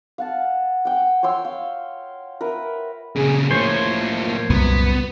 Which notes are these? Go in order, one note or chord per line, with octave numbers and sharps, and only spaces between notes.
F5 F#5 A5
F#5 G5
C#5 G5 C6 E6
F5
A#4 B4 E5
A#2 C#3 G#4
A2 F3 A#3 C5 C#5
C2 F#2 A#2 B3